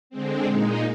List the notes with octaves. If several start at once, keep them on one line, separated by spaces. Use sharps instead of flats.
D3 G#3 C4
A#2 G#3 D#4